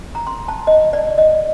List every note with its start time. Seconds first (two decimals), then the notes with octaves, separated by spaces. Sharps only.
0.15 A#5
0.27 C6
0.48 A5
0.67 D#5
0.93 D5
1.18 D#5